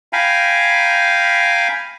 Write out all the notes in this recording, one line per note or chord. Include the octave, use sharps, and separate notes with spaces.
F5 G5 G#5 A#5 B5